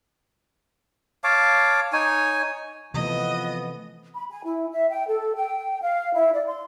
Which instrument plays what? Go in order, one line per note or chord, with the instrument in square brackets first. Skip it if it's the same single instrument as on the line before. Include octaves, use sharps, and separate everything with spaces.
[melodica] C#5 F5 A5 D6
D#4 C#5 G#5
[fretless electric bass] C3 E3 A3 [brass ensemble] F3 B3 [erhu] D#5
[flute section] B5
G#5
E4
E5
G5
A4
G5
F5
E4
D5
C6